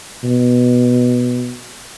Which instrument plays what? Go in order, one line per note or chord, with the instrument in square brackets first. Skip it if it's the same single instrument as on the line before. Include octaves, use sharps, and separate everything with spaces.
[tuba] B2